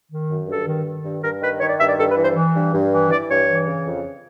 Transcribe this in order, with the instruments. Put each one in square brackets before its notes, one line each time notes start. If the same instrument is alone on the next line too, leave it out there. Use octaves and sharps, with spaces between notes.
[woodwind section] D#3
F#2
G2 A4
D#3
D#3
G2
G2 A#4
D#3 B4
D#3 C#5
D5
G2 E5
D5
G2 A4
B4
E3
C5
E3
G2
G2
E3
E3 D5
G2 C#5
E3
C#3
F2